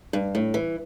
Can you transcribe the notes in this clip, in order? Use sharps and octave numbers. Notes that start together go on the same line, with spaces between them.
G2
A2
E3